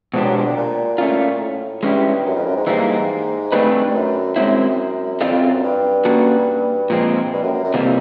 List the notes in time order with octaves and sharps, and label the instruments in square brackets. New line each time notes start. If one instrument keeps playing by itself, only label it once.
[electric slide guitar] B2 G#3 B3 D4 G4 [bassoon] F3
[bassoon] F#3
F3
D3
A#2
[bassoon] A#2 [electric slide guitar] A3 C#4 F4
[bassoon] A2
[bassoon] G2 [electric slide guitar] G#3 C#4 E4 G4
[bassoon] F#2
F2
F#2
G#2
[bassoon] G#2 [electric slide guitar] E3 G3 A#3
[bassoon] G2 [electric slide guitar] A3 C4 D#4 G#4 B4
[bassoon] G2
F#2
[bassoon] F#2 [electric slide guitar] G#3 C4 E4
[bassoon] F2 [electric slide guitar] C4 F4 A4 D5 F5
[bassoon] F2
F#2
F#2
G2
[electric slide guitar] A#3 C#4 F#4 A4
A#2 F3 G#3 C4
[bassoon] G2
F#2
F#2
F#2
[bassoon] F2 [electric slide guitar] C3 E3 G3 A#3